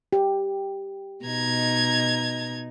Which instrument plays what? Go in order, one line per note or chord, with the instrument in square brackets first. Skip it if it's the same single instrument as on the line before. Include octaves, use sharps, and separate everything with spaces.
[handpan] G4
[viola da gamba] B2 D#4 [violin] A#5 G#6